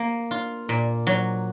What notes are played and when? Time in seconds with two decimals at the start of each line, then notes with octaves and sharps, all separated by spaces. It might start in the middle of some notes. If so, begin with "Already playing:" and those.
Already playing: A#3
0.31 F4
0.69 A#2
1.07 F#3